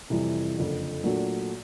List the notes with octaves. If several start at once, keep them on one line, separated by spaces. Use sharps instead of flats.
F2 C3 E3 G3
F#1 F2 D3
A#2 F#3 A3 D4